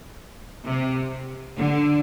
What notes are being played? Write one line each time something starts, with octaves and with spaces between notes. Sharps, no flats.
C3
D3